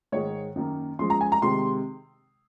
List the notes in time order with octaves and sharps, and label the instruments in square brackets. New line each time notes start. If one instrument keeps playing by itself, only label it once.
[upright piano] G#2 D#3 G#3 C#5
F#2 D#3 A#3
F#2 F3 G#3 C6
A#5
G#5
A#5
C3 D#3 G#3 C6